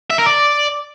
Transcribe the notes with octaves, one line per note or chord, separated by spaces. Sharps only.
E5
A#4
D5